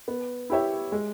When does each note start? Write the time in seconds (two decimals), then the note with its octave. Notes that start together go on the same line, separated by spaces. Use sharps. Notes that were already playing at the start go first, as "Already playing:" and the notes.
0.08 B3
0.50 E4 G4 C#5 E5
0.92 G#3